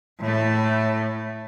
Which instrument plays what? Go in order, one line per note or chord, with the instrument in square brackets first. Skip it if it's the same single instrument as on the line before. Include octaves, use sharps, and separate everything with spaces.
[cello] A2 A3